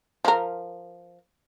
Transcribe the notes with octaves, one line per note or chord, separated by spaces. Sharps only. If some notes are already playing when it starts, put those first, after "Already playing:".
F3 A#4